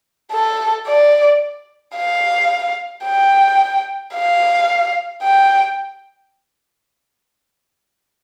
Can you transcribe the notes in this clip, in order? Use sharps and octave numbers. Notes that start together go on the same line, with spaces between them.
A4
D5
F5
G5
F5
G5